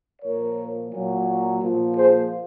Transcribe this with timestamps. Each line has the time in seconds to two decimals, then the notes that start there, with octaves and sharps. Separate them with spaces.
0.22 A#2 F3 A#4 C#5
0.92 A#2 F#3
1.62 A#2 F3
1.96 G#4 C5